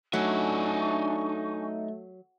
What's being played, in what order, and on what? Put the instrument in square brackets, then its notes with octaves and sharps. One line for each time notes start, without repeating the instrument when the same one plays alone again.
[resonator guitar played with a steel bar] F#3 [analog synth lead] A3 [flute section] D4 G#5 C#6 [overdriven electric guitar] D#4 E5